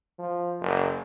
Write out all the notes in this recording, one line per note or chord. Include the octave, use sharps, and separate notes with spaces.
F3
F#1